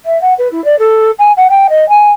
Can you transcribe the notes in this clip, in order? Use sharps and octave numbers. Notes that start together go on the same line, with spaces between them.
E5
F#5
B4
E4
D5
A4
G#5
F#5
G5
D#5
G#5